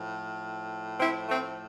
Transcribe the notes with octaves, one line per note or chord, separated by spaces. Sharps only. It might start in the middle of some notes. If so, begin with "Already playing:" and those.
Already playing: A2 F3
C4 E4
A3 C4